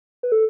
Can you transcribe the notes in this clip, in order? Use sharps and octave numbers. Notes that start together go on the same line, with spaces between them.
B4
A4